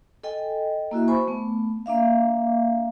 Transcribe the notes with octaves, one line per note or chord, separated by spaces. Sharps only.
A4 D#5 G5 G#5
A#3 E4 F#4 E5
C5 G#5 B5 C#6
A3 B3
A#3 D4 E5 F5